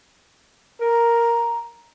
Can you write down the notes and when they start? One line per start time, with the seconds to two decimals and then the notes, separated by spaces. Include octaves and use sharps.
0.81 A#4 A#5